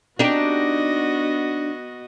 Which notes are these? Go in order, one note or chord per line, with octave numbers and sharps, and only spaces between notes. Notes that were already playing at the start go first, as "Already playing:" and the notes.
B3 D4 D#4 F#4 G4 D#5